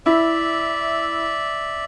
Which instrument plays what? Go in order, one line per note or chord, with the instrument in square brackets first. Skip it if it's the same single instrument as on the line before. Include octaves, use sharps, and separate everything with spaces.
[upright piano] E4 [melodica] D5 E5